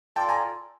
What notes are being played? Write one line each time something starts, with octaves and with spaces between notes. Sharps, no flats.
F4 A4 D5 G5 A5
G#5 A#5